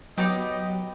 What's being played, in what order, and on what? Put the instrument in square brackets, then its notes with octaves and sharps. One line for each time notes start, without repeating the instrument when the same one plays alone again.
[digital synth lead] F#3 [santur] B3 D5 G5 [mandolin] D#4 G4 [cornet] D#5